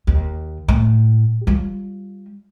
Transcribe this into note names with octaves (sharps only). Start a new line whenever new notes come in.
D#2
A2
G3 F4